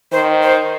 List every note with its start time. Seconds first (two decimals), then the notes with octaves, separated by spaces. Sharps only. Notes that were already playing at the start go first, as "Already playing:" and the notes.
0.12 D#3 C5
0.43 C5